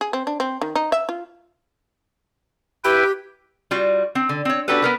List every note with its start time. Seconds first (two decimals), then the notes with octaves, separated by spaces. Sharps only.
0.01 G#4
0.13 C4
0.27 D4
0.40 C4
0.61 D#3
0.75 D#4
0.92 E5
1.09 F4
2.84 E4 G4 B4 G5
3.71 G3 F4 F#4
4.15 C4
4.29 D3
4.45 C4 C#5
4.68 B3 D4 F#4 G4 A4 B4
4.82 B3 A#4 B4